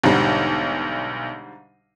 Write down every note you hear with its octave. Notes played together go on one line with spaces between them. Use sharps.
B1 G#2 D3 G3